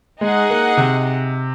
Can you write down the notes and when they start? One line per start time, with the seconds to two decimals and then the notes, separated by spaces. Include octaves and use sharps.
0.21 G#3 D#4 G#4 D#5 F#5
0.50 A#3
0.77 C3